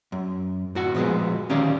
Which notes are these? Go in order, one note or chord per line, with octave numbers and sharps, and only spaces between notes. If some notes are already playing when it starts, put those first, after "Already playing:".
F#2
A2 F#4 F#5
A#2 F3 G#3 B3 G#4
D2 D#3 C#4 G4 D5 F5